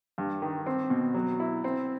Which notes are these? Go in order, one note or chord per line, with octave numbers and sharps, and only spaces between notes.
G2
D#3
C4
B2
F#3
E4
C4